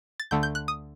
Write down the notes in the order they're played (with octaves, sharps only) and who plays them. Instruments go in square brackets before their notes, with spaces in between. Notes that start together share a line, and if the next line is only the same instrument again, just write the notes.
[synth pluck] A6
D2 D3 A3 G6
G6
F#6
D#6